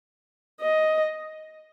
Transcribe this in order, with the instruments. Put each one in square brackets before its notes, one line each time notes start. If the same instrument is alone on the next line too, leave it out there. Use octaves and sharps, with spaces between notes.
[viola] D#5